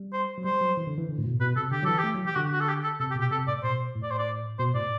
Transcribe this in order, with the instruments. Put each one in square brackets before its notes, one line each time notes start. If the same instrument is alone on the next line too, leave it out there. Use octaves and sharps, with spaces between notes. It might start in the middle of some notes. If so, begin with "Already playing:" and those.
Already playing: [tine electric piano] G3
[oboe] C5
[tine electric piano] F#3
[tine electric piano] G3 [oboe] C5
[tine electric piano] F#3
E3
D3
E3
D3
A2
B2
[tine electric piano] B2 [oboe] B4
[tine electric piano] C3 [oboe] A4
[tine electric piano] D3 [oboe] G4
[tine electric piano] E3 F#3 [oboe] A4
[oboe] G4
[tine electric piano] A3
F#3
[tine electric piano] E3 [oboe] G4
[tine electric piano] D3 [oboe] F#4
[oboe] F#4
A4
G4
A4
[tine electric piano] C3 [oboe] A4
[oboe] G4
[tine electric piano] B2
[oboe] G4
[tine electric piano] C3 [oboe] A4
[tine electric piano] A2 [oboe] D5
[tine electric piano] B2 [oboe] C5
[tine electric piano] A2
[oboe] D5
C5
D5
[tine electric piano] B2 [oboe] C5
[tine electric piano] A2 [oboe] D5